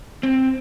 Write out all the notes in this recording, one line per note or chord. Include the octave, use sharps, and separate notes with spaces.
C4